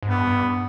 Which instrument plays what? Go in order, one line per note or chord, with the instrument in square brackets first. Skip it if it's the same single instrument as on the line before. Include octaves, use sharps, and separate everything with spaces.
[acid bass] G#2
[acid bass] G2 [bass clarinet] B3
[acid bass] G2